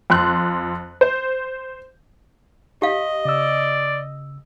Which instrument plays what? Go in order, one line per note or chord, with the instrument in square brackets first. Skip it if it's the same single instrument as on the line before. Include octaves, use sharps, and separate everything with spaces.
[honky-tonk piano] F2 C6 F#6
C5
[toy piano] G4 F5 [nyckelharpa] D#5
[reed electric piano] C#3 E6 [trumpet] D5